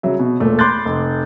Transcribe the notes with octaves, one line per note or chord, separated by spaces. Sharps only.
C#3 F#3 E5
B2
E1 A#2 A3
B5 C6 D6 F#6 G6 A6
F1